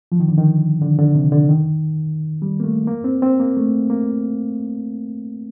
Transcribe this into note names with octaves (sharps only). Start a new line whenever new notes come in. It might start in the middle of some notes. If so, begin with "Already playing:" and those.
F3
D#3
D3
D#3
D3
D3
C3
D3
D#3
G3
A#3
A3
A#3
C4
C4
A#3
A3
A#3